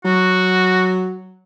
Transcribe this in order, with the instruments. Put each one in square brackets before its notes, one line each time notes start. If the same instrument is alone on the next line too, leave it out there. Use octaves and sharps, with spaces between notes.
[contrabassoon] F#3 [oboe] F#4